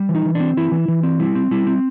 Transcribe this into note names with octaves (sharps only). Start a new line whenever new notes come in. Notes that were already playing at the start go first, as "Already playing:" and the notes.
Already playing: G3
E3
D#4
E3
C4 D4
E3 E4
E3
E3
C4
G3 E4
C4
G3 E4
C4